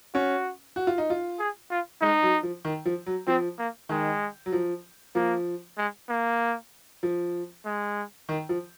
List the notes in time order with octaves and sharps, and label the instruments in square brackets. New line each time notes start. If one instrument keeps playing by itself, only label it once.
[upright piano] C#4 [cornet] F#4
[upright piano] F#4
F4
D#4
F4
[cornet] G#4
F4
[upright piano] G#3 [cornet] D#4
[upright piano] F#3
F3
D#3
F3
F#3
[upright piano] F3 [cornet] C4
[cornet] A#3
[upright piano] D#3 [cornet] G#3
[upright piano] F#3
F3
[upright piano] F3 [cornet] A#3
[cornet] G#3
A#3
[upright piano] F3
[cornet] G#3
[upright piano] D#3
F3